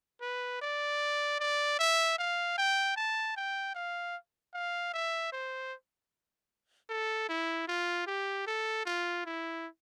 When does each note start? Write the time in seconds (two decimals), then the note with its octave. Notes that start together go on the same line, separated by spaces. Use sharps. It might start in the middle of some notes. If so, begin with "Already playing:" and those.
0.21 B4
0.62 D5
1.40 D5
1.79 E5
2.19 F5
2.58 G5
2.96 A5
3.37 G5
3.75 F5
4.54 F5
4.94 E5
5.33 C5
6.90 A4
7.29 E4
7.68 F4
8.07 G4
8.47 A4
8.86 F4
9.26 E4